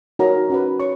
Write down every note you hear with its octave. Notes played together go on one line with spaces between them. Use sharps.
D#4 F#4 A#4 C#5 A#5
C#4 F#4 B4
C#5 C#6